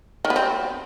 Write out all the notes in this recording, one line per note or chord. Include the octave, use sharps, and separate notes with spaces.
D#3
B3
C4